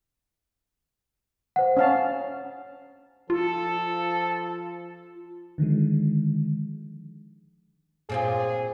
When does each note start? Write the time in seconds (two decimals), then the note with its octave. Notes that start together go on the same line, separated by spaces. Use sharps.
1.56 C5 F#5
1.77 C#4 F5 A5
3.30 F3 F4 A4
5.58 D3 D#3 F3 G#3
8.09 A#2 C4 F4 G#4